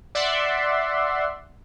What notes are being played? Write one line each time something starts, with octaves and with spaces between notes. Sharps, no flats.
D5 E5 F#5 C6